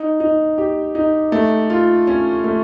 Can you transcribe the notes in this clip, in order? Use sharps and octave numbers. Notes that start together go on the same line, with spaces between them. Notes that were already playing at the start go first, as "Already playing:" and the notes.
Already playing: D#4
D#4
G4
D#4
A3
F4
C#4
A3